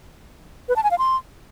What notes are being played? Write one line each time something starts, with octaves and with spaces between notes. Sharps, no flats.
B4
A5
G#5
F5
C6